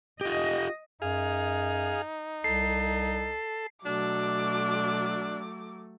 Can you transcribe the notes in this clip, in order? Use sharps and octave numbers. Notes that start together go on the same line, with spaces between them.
F4 G4 D#5
F#2 D#4 G#4 F5
C2 A4 C7
B2 F#3 A3 D4 D6